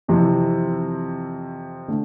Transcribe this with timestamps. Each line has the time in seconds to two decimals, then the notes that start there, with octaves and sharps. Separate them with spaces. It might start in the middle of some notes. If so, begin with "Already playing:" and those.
0.08 F2 C3 E3
1.88 D3 A3